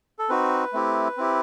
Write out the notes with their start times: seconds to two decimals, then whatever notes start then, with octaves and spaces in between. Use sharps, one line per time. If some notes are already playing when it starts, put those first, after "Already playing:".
0.19 A4
0.29 C4 D#4 F#4 B4
0.73 A3 C4 E4 G4
1.17 C4 E4 G4